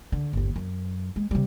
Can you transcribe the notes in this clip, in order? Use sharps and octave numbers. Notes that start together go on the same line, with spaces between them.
D3
G1 D#2
F#2
G#3
C3 G3